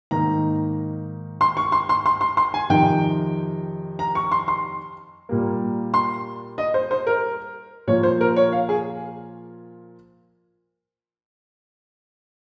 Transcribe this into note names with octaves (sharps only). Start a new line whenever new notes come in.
G#2 D#3 A#3 A#5
C6
C#6
C6
C6
C6
C6
C6
G#5
F2 C3 D#3 G5
A#5
C#6
C6
C6
A#2 G3 A#3
C6
D#5
C5
C5
A#4
A#2 F3 A#3 C#5
C5
A#4
C#5
F5
G#4